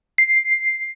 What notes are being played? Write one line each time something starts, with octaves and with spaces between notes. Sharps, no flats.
C7